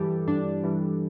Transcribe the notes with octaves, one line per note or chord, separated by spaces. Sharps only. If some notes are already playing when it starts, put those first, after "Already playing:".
Already playing: G2 E3 G3 G4 A4
G2 D4
E3 G3